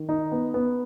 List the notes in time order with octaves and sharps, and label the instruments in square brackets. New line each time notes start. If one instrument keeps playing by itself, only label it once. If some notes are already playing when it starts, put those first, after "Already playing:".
Already playing: [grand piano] D#3
D#4
B3
B3